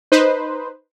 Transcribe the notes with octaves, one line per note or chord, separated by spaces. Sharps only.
D#4 B4 C5